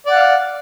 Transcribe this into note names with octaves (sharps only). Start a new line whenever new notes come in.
D5 F5 F#5